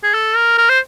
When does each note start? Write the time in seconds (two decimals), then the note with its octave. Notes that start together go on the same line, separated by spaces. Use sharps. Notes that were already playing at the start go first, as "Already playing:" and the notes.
0.03 G#4
0.14 A4
0.35 A#4
0.58 A#4
0.69 C5